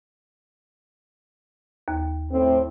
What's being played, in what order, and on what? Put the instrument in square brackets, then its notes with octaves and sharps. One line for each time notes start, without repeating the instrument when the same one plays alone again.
[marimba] D#2
[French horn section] A2 C4